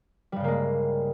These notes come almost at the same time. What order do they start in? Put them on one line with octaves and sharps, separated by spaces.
G3 G2 C#3 A#3 G#3